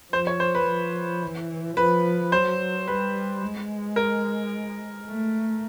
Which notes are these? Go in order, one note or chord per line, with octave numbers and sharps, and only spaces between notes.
F3 C5
C#5
C5
B4
F3
E3
F3 B4
F#3 C5
G3 B4
G#3
A#4
A3